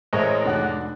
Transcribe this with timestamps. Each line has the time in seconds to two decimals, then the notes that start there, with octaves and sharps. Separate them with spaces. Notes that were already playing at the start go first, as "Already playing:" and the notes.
0.13 A1 A2 G#3 A#4 C5 C#5 D#5 E5
0.45 F1 D4 F#4 F#6